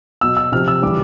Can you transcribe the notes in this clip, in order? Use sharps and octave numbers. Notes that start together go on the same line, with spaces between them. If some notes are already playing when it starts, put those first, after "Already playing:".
B2 F#3 E6
E6
C3 F3 F6
E6
C#3 E3 G3 D6